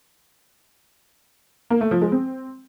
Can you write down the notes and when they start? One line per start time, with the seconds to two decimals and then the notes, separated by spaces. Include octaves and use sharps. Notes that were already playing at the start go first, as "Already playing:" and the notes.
1.70 A#3
1.81 A3
1.91 F3
2.02 G#3
2.12 C4